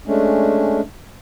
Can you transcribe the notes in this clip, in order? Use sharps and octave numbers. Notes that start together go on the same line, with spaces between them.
G#3 A3 C#4 D4